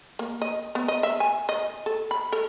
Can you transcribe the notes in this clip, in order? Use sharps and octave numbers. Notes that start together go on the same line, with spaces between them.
A#3
D#5
B3
D#5
E5
G#5
D#5
A4
B5
A4